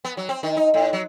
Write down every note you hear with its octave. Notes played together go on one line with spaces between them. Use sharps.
B3
F#3
C4
D#3
D#4
A2
F#3